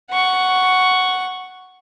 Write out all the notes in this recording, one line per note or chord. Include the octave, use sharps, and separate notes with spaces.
F#5 C#6